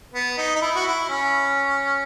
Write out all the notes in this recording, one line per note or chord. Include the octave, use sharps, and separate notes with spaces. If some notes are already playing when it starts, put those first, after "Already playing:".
B3
D#4
D#4
E4
F#4
E4
C#4